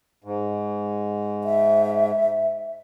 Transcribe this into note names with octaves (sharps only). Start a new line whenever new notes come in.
G#2
E5